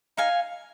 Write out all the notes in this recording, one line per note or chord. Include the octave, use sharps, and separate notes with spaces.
D#4 F5 G#5